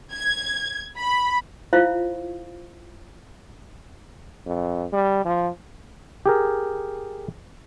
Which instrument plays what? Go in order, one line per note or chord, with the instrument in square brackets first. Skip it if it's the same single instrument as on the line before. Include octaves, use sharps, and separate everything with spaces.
[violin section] G#6
B5
[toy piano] E4 F4 C5 E5 F5
[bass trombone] F2
G3
F3
[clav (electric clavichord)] G4 G#4 A#4